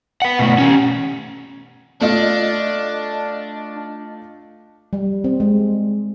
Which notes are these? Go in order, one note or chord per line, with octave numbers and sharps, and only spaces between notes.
B4 F#5
B2 A3
C#4 G4
A3 D4 F4 D#5
G3
C4
G#3